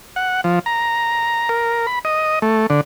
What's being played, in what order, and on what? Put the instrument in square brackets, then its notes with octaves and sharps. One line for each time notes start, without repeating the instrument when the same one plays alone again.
[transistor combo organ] F#5
F3
A#5
A#4
B5
D#5
A3
D3